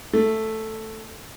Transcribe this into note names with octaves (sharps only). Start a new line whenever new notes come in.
A3